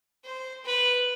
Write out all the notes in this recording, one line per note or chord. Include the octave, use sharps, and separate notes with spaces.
C5
B4